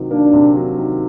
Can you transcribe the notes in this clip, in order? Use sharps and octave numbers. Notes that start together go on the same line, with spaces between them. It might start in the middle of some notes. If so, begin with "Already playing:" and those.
Already playing: C3 D#3 F#3
A#3 D4
C3
F#3
D#3